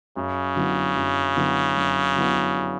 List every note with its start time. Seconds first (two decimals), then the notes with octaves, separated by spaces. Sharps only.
0.17 F#2 C#3
0.56 D3 F#3 B3 E4
0.96 F#2
1.37 D3 F#3 B3 E4
1.77 F#2
2.16 D3 F#3 B3 E4